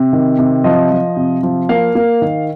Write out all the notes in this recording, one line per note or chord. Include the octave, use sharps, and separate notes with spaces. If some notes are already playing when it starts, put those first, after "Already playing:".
Already playing: C3
D#3
C3
F3 D#5
F3
C3
F3
A#3 F5
A#3
D#3